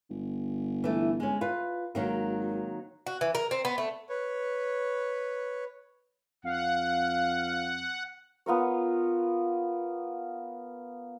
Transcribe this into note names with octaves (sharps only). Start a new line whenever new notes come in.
G1
E3 A3
G#3 C#4
F4 B4
G#1 D#3 F#3 A#3
F#4
E3
A#4
C4
B3
A3
B4 C#5
F2 F5 F#5
B3 F4 A#4 C#5